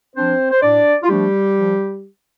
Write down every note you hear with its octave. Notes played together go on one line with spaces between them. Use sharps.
F3 C4 D4 C5
C5
A2 D4 D5
F4
F3 G3 A3 D4 G4
F3